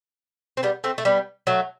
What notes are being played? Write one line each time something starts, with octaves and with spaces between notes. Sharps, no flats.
C4
G3 B3
A3 C4
A3
G3 B3
F#3 A3